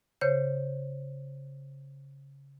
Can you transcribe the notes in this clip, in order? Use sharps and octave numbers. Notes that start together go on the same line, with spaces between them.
C#3 C5 C#5 G6